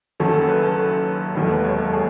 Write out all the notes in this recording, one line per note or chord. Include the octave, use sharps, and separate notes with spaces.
F#1 F#2 D#3 F#3 C#4 A4
A4
B4
A4
E1 D#2 D#3 F#3 A4
B4
C#5
A4
G#4